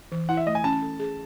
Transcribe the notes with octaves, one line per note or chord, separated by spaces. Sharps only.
E3
E4 F#5
E5
A3 D#5
G#5
C#4 A5
A4
G#4